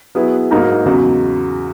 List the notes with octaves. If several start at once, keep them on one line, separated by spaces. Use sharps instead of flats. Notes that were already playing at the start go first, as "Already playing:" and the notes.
F#3 B3 E4 G#4 B4
G#2 F#3 A#3 D#4 A#4
E2 C#3 F#3